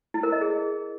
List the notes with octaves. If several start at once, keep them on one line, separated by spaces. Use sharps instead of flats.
E4
A#4
D#5
G#4